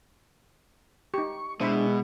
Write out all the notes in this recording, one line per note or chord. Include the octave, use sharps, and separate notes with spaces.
D#4 G4 C#6
B2 G#3 D4 E4 C5 E5 B5